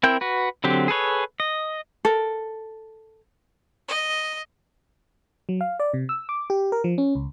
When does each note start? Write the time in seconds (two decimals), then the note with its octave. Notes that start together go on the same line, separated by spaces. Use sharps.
0.03 C4 E4 A#4 G5 G6
0.21 F#4 B4
0.64 D3 F#3 C4 G4
0.88 G#4 A4 B4 C#5
1.40 D#5
2.05 A4 A#4
3.89 D#5
5.49 F#3
5.61 F5
5.80 D5
5.94 C3
6.09 E6
6.29 D6
6.50 G4
6.72 A#4
6.84 F3
6.98 C#4
7.15 C#2